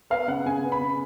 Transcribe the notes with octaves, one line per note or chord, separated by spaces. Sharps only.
B3 F5
C#3 F#5
C#3 G#5
B3
B5
C#3